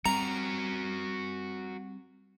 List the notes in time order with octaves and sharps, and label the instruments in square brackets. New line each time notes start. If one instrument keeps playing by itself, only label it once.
[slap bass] G3 C4 [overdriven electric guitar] F#4 A#4 [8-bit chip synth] A#5